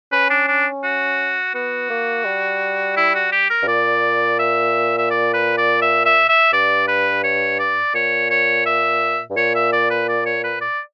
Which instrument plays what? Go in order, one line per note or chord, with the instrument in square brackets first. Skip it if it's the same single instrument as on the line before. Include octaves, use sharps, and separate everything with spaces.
[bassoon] C#4 [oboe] B4
[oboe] D4
D4
F#4
[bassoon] B3 [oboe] F#4
[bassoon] A#3
G3
[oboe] E4
F#4
G4
A#4
[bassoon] G2
[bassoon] A#2 [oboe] D5
[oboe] E5
E5
D5
B4
D5
E5
E5
E5
[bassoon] G2 [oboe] D5
[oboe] B4
C#5
D5
[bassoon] A#2 [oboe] C#5
[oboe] C#5
E5
[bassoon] G2
[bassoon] A#2 [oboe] C#5
[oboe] E5
D5
B4
D5
C#5
B4
D5